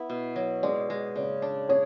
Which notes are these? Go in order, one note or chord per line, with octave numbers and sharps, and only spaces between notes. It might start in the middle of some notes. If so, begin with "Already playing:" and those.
Already playing: B3 E4
B2
F#3
G#3 D5
G#3
C#3 D5
D4
G#4 C#5